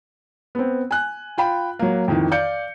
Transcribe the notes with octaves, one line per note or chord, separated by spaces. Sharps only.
B3 C4
G#5 F#6
F4 G5 B5
F#3 A#3
F2 D#3 E3
D5 F5 G6 C#7